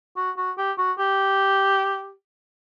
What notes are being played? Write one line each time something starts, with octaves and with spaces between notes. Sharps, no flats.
F#4
F#4
G4
F#4
G4